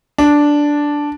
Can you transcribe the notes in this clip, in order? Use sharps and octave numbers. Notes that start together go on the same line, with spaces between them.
D4